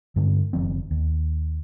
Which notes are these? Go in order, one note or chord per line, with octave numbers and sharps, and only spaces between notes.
G2 D3 G#3 C4
F#1 D#3 F3 C4
D#2